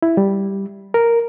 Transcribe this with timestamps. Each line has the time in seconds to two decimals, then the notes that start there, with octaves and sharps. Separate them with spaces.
0.02 E4
0.17 G3
0.94 A#4